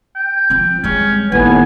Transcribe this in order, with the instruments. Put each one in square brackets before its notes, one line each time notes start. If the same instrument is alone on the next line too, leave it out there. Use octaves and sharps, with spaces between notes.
[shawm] G5
[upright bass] F3 C4
[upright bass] G3 G#3 [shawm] C#4
[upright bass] A1 [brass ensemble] D#2 A2 B3 [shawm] G#5